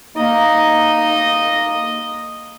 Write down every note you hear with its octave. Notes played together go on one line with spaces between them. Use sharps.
A#3 D#4 D#5